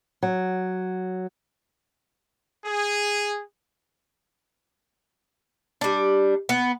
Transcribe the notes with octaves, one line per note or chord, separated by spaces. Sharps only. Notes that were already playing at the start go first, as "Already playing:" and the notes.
F#3
G#4
G3 D4
B3